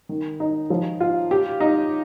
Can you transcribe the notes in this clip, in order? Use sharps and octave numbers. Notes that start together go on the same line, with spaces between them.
D#3
D#4
F3
F4
G4
D#4